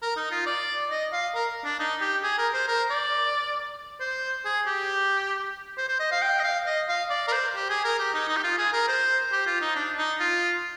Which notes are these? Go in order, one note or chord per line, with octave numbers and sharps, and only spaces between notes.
A#4
D#4
F4
D5
D#5
F5
A#4
D4
D#4
G4
G#4
A#4
C5
A#4
D5
C5
G#4
G4
C5
C5
D#5
F5
G5
D#5
F5
D#5
F5
D5
A#4
C5
G4
G#4
A#4
G4
D#4
D#4
G4
F4
G#4
A#4
C5
G4
F4
D#4
D4
D#4
F4